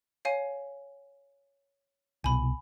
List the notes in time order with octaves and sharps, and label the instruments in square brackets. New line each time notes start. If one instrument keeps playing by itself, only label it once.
[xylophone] C#5 F5 G#5
[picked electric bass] C2 B2 [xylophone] G#5 B5